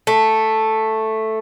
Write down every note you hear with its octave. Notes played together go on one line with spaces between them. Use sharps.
A3